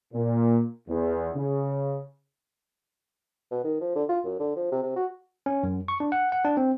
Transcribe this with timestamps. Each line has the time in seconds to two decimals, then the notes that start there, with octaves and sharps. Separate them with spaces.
0.13 A#2
0.88 E2
1.35 C#3
3.51 B2
3.64 D#3
3.81 F3
3.95 D3
4.09 F4
4.24 F#2
4.40 D3
4.56 F3
4.71 C3
4.83 C3
4.96 F#4
5.46 C#4
5.63 F#2
5.88 C#6
6.00 D4
6.12 F#5
6.32 F#5
6.45 D4
6.57 C4